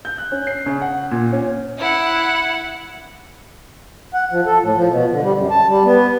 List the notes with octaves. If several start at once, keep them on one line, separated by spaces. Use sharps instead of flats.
G6
F#6
C#4
C7
C#3
F#5
A#2
C#4
E4 F#5
F#5
F3
A4
A2
F3
B2
D3
G3
F#2
A5
G3
B3